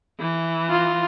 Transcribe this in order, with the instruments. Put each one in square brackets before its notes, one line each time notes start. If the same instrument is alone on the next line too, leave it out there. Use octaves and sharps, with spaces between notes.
[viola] E3
[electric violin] F4